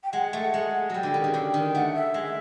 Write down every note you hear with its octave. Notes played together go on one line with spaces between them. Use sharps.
G5
G#3 F#5
A3
G#3
F#3 G3 G5
D3
D#3
C#3
D3
D#3
A3 F#5
E5
G#3